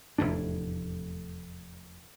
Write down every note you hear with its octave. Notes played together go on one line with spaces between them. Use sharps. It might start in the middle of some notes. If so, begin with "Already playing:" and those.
F1 E2 A2 D4